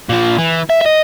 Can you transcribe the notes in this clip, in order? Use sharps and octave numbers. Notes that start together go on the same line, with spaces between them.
A#2 F3
E3
E5
D#5 E5